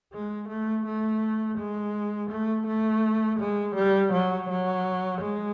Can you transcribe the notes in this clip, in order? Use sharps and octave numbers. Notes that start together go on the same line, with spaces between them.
G#3
A3
A3
G#3
A3
A3
G#3
G3
F#3
F#3
G#3